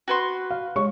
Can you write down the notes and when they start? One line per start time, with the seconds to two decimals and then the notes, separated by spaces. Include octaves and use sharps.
0.08 F#4 B4 C6
0.51 F5
0.76 G#3 C#5 C#6